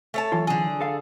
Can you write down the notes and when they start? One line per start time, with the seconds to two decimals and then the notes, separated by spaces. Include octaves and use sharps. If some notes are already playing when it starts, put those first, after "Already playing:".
0.14 A3 C#5 A5
0.32 E3 F#3 F4
0.47 D3 G#4
0.81 A4 F5